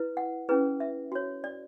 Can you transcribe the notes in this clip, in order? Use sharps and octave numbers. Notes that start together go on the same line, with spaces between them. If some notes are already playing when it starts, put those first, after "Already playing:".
Already playing: E4 B4
F#5
C#4 E4 G#4 B4
E5
F#4 C#5
D5